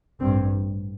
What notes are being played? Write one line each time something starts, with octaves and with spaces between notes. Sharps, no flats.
A1 G2 C4